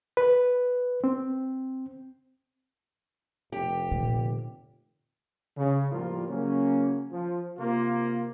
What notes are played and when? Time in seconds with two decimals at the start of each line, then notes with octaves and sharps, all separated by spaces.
0.17 B4
1.04 C4
3.52 F1 G4
3.91 A#2 D3
5.57 C#3
5.92 A2 F3 G3 A#3 F4 A#4
6.28 C#3 F#3 A#3 C#4
7.11 F3
7.58 C3 A#3 F4